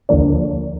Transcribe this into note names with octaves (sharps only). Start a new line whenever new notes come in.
D#2 D3 F3 A#3 D4